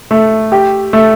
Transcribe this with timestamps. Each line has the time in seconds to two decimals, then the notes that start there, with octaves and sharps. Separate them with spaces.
0.11 A3
0.52 G4
0.93 A3